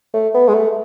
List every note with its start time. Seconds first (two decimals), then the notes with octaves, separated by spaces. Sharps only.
0.14 A3
0.34 B3
0.48 G#3
0.54 A3